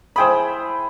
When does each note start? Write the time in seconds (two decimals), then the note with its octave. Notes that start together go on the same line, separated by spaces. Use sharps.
0.16 E4 G#4 C5 G5 B5 D#6